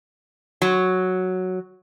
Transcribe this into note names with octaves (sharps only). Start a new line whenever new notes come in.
F#3